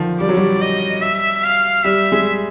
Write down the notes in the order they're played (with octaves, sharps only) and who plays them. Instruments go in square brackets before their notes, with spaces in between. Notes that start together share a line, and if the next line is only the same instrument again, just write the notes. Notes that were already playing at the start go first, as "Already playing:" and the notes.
Already playing: [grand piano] D3 D#3 F3
[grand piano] G3 [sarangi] D5
[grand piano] F#3
G3
[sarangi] D#5
E5
F5
[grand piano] G3 [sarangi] E5
[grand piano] G#3